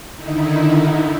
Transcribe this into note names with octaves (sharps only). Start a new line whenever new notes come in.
D3 D#3 D#4 E4